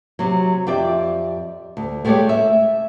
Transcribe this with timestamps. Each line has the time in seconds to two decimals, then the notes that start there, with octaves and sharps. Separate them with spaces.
0.19 C3 F#3
0.67 F2 G4 D5 E5
1.77 D2
2.05 G#3 A3 B3 G4 C#5 D5
2.29 E5